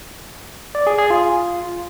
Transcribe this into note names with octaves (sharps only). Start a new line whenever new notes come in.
D5
G#4
G#4
F4